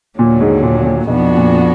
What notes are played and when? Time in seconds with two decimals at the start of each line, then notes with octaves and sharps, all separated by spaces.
0.18 D#2 A#2 D3 F#3
0.41 G#2
0.63 A#2
0.85 A#2
1.07 B1 F2 B2 F3 B3 D4 F#4
1.37 A#2